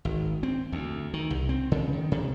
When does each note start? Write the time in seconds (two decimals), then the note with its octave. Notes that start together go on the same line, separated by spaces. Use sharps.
0.05 G#1
0.43 C4
0.72 D2
1.14 D#3
1.30 C2
1.49 C4
1.72 C#3
1.93 D#3
2.12 C3